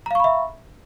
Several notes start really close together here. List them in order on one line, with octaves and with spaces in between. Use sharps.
A#5 F5 C#6 B5 E5